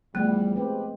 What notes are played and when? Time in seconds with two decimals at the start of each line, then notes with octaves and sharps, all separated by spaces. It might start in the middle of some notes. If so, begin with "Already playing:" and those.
0.15 E2 F3 G3 A3 B3
0.56 G#3 C4 G4 B4